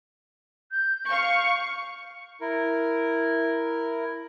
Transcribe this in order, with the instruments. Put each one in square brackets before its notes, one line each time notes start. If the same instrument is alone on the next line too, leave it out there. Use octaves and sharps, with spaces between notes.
[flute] G6
[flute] F5 [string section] C#6
[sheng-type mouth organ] E4 A#4